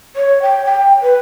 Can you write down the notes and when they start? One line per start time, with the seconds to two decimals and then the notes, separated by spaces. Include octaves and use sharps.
0.16 C#5
0.42 G5
0.65 G5
1.03 B4